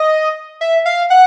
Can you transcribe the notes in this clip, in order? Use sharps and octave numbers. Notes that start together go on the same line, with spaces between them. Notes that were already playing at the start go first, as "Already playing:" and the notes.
Already playing: D#5
E5
F5
F#5